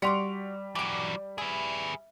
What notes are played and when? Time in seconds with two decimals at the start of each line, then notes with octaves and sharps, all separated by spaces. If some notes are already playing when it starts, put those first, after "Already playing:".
0.02 G3 F#4 C6 D6 B6 F7
0.75 E3 F#3 G4 D6
1.38 E4 G#4 B4